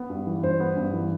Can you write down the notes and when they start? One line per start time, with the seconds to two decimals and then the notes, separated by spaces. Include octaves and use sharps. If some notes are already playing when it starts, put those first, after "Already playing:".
Already playing: B3
0.10 G2
0.27 E3
0.43 G2 C5
0.60 B3
0.76 G2
0.93 E3